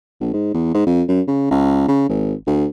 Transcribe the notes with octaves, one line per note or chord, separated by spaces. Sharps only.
A#1
G#2
E2
G#2
F2
F#2
C#3
C#2
C#3
G#1
D2